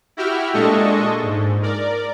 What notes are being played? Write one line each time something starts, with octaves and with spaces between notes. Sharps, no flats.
E4 F#4 G4 E5 G5 F6
A#2 G#3 D4 A4 D#5 C#6
G#2
A#4 D5